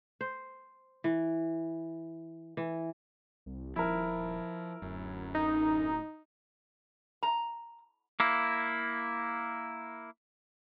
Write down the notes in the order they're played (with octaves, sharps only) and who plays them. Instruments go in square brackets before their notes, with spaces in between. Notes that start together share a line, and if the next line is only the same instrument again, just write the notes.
[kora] C5
E3
E3
[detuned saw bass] C2
[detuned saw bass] D#1 [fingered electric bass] F3 [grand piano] E4 A#4
[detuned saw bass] D1 [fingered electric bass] F#2
[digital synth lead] D#4
[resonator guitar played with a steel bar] A#5
[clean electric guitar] A#3 E4